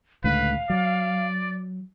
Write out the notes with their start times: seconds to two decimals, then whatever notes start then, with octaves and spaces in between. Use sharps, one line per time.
0.24 C#2 A2 D3 B4 F5
0.70 F#3 D5